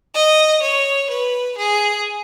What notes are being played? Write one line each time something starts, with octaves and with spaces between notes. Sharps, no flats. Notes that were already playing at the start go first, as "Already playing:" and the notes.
D#5
C#5
B4
G#4